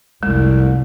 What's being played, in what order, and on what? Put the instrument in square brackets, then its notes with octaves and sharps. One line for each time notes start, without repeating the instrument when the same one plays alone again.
[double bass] F1 [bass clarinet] C2 [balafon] G#3